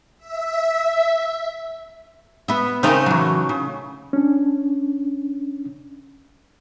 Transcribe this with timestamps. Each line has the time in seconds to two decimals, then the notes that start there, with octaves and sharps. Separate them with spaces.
0.18 E5
2.48 B3 E5
2.83 C#3 A3 C4 D#4 A#4
3.06 E3 F#3
3.49 C#3
4.13 C#4 D4